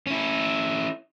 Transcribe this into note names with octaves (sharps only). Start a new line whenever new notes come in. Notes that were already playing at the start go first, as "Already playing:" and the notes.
C#4 E4